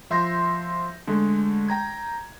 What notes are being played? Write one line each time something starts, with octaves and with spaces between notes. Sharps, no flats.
F3 E5 C6 G6 A#6
D3 G#3 A3
G5 A#5 G#6